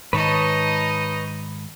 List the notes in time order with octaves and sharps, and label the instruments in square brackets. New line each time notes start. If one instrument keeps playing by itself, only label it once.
[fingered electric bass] G#2 D#3 [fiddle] D#4 D#5 [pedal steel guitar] B4 C#5 A5